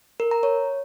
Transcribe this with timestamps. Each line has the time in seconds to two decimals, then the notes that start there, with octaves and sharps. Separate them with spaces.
0.20 A#4
0.31 A#5
0.43 C#5